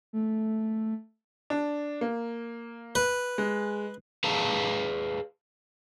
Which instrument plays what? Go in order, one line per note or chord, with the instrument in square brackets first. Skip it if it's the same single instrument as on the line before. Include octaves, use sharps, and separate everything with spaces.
[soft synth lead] A3
[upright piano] D4
A#3
[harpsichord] B4
[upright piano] G#3
[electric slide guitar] G#4 B4 F5 A5 A#5